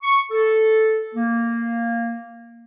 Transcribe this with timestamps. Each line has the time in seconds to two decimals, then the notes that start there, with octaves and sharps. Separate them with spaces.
0.03 C#6
0.31 A4
1.13 A#3